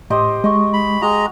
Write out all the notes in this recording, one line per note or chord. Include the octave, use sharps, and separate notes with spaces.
A2 G4 C5 D#5
G#3 D#5 C#6
B5
G#3 F#4 D#5 A#5